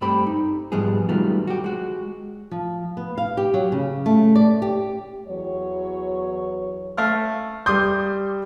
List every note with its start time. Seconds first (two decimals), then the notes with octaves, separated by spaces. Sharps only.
0.01 G2 A3 C4 G4 B5
0.26 D#4
0.72 G#2 F3 G3 B3 G#4
1.09 D#3 F#3 G3 A3 B3 F4
1.47 F#4 G4
1.64 G#3 F#4
2.51 F3
2.97 B3
3.18 F5
3.37 G4
3.54 F#3
3.72 C#3
4.06 A3
4.35 D5
4.62 G4
5.28 E2 F#3 C#5
6.97 A3 F5 F6
7.66 G3 C6 D6 D#6 G6